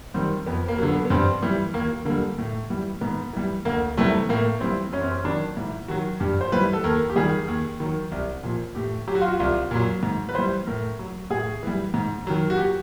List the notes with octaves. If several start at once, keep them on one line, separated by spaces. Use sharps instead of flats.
D#3 G3 C4
F2 B3
A#3
D3 F#3
B3
B3
G2 C4
E3 G3
D#2 A#3
D3 G3 A#3
A2
E3 G3
G#2 B3
E3 G3
D2 A#3
C3 E3 G3 A3
A2 A#3
E3 G3 C4
F#2 C#4
C4
C#4
D#3 F#3 D4
G#2 E4
D#3 F#3 F#4
G2 G4
C5
E3 G3 B4
A4
D#2 A#4
G4
D#3 G3 G#4
D#2
D#3 F#3
C2
A#2 F3
A2 G4
F#3 G4
F#4
F4
F#4
C2 F4
A#2 F#3
G#2
B4
E3 G3 C5
A2 A#4
F#3
A2 G#4
E3 G3
G#2
D#3 F#3
F#4
G4